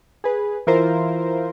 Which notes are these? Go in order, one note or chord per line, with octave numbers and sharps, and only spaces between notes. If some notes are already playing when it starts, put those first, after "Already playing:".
G#4 B4
E3 E4 F4 A#4 C5